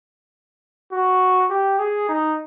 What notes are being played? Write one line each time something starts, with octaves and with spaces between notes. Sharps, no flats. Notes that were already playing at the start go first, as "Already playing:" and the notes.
F#4
G4
G#4
D#4